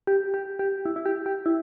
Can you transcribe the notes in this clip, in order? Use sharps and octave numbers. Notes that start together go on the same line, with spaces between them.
G4
G4
G4
E4
E4
G4
G4
E4